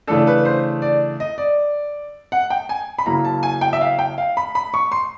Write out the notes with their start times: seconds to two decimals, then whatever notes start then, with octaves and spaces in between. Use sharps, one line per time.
0.07 C#3 E3 A3 D4 A4
0.27 B4
0.45 C5
0.82 D5
1.20 D#5
1.38 D5
2.32 F#5
2.50 G5
2.69 G#5
2.98 B5
3.06 C#3 F#3 A#3 C#4 E4 A#5
3.25 A5
3.43 G#5
3.61 G5
3.73 E5
3.81 F5
3.99 G5
4.18 F5
4.37 B5
4.55 B5
4.74 C#6
4.92 C6